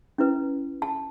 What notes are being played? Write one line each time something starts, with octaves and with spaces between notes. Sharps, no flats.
C#4 E4 B4
A5